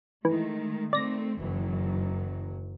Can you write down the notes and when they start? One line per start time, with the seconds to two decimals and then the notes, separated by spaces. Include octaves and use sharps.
0.25 D#3 E3 G#3 A3
0.93 D#3 A3 C4 D5 A#6
1.39 F#1 F#2 D#3 E3 F#3